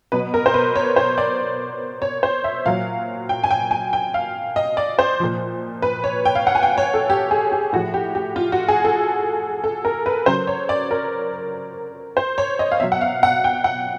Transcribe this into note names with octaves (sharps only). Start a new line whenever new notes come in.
B2 F#3 B4
A#4
C5
B4
C#5
C5
D5
C#5
C5
E5
A#2 F#3 F5
G5
G#5
G5
G#5
G5
F5
D#5
D5
C5
A#2 F3
B4
C#5
G5
F5
F#5
G#5
G5
C#5
A4
G4
G#4
G4
A2 F3 F#4
G4
G4
F4
F#4
G#4
A4
A4
A#4
B4
C#3 F#3 C5
C#5
D5
A#4
C5
C#5
D#5
F5
B2 F#3 E5
F#5
F5
F#5
G5
F#5